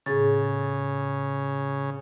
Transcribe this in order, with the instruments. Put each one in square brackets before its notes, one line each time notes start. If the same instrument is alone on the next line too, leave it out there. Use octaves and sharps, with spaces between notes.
[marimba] A2 G#4 A6 [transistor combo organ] C#3